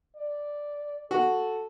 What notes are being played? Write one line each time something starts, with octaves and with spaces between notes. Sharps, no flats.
D5
F#4 A4